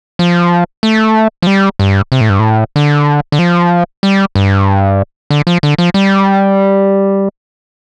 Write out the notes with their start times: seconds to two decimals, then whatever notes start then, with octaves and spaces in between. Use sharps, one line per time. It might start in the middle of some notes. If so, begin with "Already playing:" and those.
0.19 F3
0.83 A3
1.42 F3
1.47 G3
1.79 G2
2.12 C3
2.21 A2
2.30 G2
2.39 A2
2.76 D3
3.32 D3
3.39 F3
4.03 G3
4.35 G2
5.30 D3
5.47 F3
5.63 D3
5.78 F3
5.94 G3